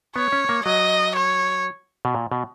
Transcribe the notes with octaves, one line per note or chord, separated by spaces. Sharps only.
B3 C#5
C#4
A#3
F#3 D#5
C#5
B2
A#2
B2